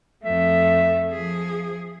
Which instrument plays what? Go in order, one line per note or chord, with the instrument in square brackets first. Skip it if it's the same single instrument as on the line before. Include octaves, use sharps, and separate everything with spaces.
[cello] F2 A3 [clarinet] E5
[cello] F3 G#4